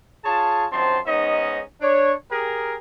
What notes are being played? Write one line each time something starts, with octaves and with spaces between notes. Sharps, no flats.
F4 G#4 C#5 A5
F#2 D#3 F3 C4 A5 C6
G#2 B3 C#4 D#4 D#5
D4 C#5
G4 G#4 A#4